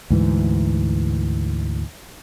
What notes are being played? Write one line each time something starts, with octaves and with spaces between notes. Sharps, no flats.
D2 G#2 E3